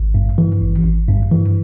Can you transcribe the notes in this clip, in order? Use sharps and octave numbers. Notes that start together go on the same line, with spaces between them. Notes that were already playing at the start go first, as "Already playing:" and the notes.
Already playing: G#1
G2
E3
G#1
G#1
G2
E3